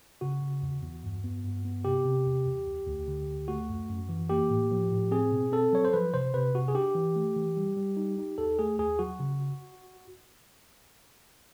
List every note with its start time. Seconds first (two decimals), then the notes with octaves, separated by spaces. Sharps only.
0.21 C#3 F#4
0.42 C#3
0.62 E2
0.82 E2
1.04 G2
1.24 B3
1.44 G2
1.65 B3
1.85 C3 G4
2.05 C3
2.26 E2
2.46 E2
2.67 D2
2.87 D2
3.08 D3
3.28 D2
3.48 A3 F#4
3.69 F#2
3.89 F#2
4.09 E3
4.29 A#3 G4
4.50 A2
4.71 F3
4.91 A2
5.11 C4 G#4
5.32 B2
5.52 C4 A4
5.73 F#3 C#5
5.85 C5
5.93 F3 B4
6.13 C3 C5
6.34 C3 B4
6.54 C3 F#4
6.68 G#4
6.74 D4 G4
6.95 E3
7.16 A3
7.36 E3
7.57 G3
7.77 G3
7.97 D#4
8.18 D#4
8.38 D#2 A4
8.59 A3 G#4
8.79 D#2 G#4
8.99 F#3 F#4
9.20 C#3